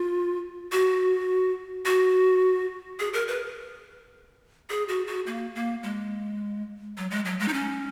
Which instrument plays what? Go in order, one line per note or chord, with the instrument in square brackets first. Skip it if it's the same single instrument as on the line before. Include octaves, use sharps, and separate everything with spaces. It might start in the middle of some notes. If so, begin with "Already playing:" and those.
Already playing: [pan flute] F4
F#4
F#4
G#4
A#4
B4
G#4
F#4
F#4
A#3
A#3
G#3
F#3
G#3
F#3
G#3
D#4
C#4